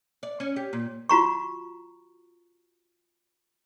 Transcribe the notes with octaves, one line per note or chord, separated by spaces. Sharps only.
D5
C#4
G4
A#2
F4 F#4 A#5 C#6